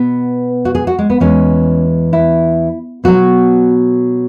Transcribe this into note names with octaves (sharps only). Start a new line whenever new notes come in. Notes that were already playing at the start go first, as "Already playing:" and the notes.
Already playing: B2 B3
F#4
G#4
F#4
G#3
B3
E2 E3 G#3 C#4
E4
B2 F#3 F#4